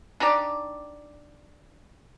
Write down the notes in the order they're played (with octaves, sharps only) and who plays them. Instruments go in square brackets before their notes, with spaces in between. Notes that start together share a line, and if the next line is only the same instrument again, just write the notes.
[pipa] D4 D#4 G4 D5